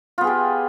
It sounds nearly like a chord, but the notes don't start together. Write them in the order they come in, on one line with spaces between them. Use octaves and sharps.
F4 B3 G#4 G4